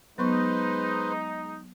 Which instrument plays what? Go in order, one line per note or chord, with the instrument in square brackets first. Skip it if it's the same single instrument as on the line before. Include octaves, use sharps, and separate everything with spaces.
[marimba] F#3 B3 C#6 [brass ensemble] G#3 D#4 [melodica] B4 C5